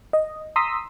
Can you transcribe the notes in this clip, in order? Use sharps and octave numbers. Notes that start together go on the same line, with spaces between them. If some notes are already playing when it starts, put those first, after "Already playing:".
D#5
A#5 C6 D#6 E6 B6